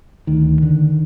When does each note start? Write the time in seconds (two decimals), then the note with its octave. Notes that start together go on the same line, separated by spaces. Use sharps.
0.27 D2 D#3
0.63 D3